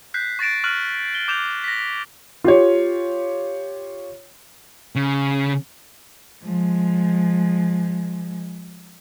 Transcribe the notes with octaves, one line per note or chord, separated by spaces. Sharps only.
F#6 G6 B6 C7
C#6 A6 A#6 D7 E7
C#6 F6 F#6 F#7
G7
D6 G6 E7 F7
A#6 B6
F4 G4 C#5
C#3
F3 G#3